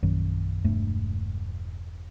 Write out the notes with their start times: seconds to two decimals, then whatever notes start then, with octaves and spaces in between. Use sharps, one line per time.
0.03 A#1 F#2 D#3 F#3
0.65 E1 G2 A3